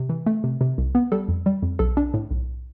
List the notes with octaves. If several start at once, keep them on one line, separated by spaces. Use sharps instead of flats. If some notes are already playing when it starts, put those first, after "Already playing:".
Already playing: C3
E3
A3
C3
C3
C2
B3
G3 A4
F2
G3
F2
B1 A4
D4
A2
B1